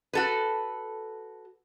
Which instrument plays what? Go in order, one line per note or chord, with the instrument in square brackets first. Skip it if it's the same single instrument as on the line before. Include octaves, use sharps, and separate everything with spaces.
[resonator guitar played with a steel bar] F#4 A4 B4